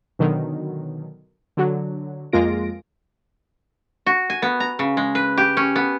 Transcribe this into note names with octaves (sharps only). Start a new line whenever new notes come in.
B2 D3 D#3 F#3
D3 F#3
F2 G#3 A#3 F4 A#6 D7
F#4
G#5
B3
A#5
C#3
G#3
B4
G4
C#4
B3